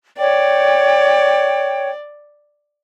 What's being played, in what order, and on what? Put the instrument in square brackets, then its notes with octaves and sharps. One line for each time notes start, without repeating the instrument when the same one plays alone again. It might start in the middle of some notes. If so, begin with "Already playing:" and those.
[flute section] C#5 G5 [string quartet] D5